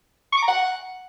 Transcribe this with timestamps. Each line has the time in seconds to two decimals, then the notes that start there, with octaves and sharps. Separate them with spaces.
0.33 C#6
0.38 D6
0.43 A#5
0.48 F#5